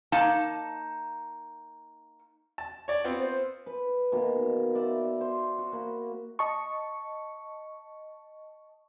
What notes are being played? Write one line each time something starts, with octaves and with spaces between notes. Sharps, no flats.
A#3 D#4 A5
A5
C#5 D5
B3 C4 F4
C5
B4
B2 D#3 A#3
D5 E5 B5
C5
F#4
A#3 B5
D#5 A5 C#6